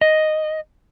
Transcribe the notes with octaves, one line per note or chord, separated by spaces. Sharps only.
D#5